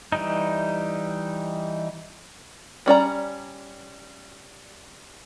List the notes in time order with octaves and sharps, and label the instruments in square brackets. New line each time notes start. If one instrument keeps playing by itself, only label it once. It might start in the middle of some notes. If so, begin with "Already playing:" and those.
[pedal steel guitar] E3 G3 D#4
[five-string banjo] G3 C#4 D5 A#5